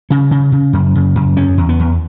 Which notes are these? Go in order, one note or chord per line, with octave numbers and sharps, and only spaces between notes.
C#3 C#4
C#3
C#3
F#2
C#3
F#2
E2 C#4
E2
B3
E2